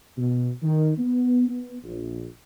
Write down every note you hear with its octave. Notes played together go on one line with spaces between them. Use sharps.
B2
D#3
B3
B3
A#1